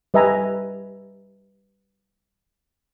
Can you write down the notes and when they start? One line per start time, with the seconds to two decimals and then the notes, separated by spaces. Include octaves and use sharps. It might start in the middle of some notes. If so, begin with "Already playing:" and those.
0.14 G3 B4 D#5 E5 G#5 A#5